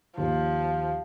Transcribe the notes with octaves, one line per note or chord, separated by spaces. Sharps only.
D#2 F3